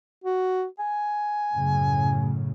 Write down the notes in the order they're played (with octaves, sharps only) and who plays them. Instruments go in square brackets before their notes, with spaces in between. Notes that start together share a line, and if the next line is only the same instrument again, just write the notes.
[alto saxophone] F#4
G#5
[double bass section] F#2 A2 C#3